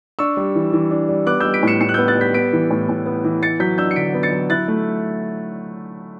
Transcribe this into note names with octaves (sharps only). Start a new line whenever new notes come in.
D4 C#6 E6
G3
E3
E3
D4
G3
B3 D6 F#6
G3 E6 G6
B6 D7
A2 C#7 E7
A2 C#7 E7
F#6
B3 E6 G6
F#6 A6
G3 G6 B6
B3 B6 D7
E3
A2
A2
B3
E3
B3 A6 C#7
F#3 G6 B6
D4 E6 G6
C#7
D3 B6 D7
B3
A6 C#7
F#3
E4 F#6 A6
A3